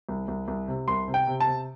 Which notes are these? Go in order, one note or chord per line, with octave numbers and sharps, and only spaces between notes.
C2
C2
C2
C3
C2 C6
C3
G5
C3
A5
C3